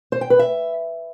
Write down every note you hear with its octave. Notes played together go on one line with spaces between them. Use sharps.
C5
G5
B4
E5